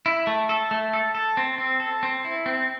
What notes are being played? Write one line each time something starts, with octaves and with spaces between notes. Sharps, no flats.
E4
A3
A4
A3
A4
A4
C4
C4
A4
C4
E4
C4